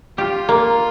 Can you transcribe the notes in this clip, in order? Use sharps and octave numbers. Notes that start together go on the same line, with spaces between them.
F4 G4
A#3